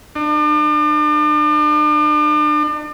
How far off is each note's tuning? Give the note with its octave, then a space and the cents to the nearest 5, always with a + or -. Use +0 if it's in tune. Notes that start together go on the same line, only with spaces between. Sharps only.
D4 +40